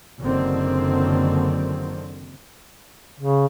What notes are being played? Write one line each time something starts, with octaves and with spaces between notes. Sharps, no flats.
F#1 D3 D#3 C4
C#3